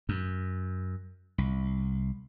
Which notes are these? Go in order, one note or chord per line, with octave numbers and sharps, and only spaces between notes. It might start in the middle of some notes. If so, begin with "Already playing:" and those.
F#2
C2